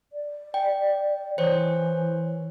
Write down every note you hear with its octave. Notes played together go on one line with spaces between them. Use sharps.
D5
G5
E3 C5 C#5